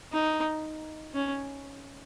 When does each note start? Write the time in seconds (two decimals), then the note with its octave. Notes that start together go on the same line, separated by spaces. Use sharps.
0.12 D#4
1.14 C#4